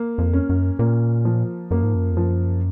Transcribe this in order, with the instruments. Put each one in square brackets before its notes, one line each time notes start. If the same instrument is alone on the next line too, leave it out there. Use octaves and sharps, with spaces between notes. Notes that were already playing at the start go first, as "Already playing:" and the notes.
Already playing: [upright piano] A#3
[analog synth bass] F2
[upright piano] C#4
[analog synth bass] F#2
[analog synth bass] A#2 [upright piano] A#3
[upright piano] F3
[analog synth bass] F#2 [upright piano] A#3
[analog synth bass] G#2
F#2
F2
[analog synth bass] F#2 [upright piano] F3